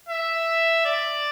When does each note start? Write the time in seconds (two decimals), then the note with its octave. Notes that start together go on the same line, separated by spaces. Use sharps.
0.08 E5
0.86 D5